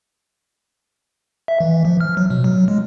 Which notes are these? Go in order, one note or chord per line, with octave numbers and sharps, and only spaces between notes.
E5
E3
F3
F6
F#3
B2
F#3
G#3